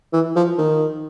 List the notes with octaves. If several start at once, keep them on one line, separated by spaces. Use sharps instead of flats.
E3
F3
D#3